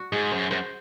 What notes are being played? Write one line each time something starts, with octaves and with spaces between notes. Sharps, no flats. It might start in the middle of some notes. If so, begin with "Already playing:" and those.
Already playing: F#4
G#2 G#4
F#2 C5
F#2 C5